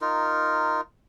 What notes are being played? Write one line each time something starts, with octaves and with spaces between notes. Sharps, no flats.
D#4 F4 A#4